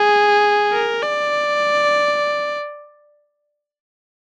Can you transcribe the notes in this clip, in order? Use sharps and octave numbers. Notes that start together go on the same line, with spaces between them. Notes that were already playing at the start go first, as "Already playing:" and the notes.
Already playing: G#4
A#4
D5